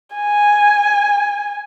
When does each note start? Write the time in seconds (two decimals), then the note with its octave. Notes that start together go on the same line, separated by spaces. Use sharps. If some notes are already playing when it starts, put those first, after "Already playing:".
0.16 G#5